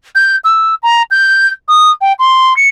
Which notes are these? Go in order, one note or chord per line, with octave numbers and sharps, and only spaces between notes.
G6
E6
A#5
G6
D#6
G5
C6
C#7